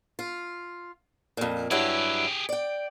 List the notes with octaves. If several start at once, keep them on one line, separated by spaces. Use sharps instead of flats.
F4
F2 A#2
G2 F#3 E4 G4 G#4
D5 G5